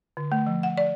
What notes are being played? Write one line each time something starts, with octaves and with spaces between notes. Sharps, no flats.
D3
A3
F3
F#5
D5